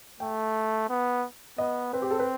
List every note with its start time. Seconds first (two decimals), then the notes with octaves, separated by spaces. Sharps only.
0.20 A3 G5
0.89 B3
1.58 B3 D#5
1.93 C4 B4
2.02 G4
2.11 A4
2.19 B4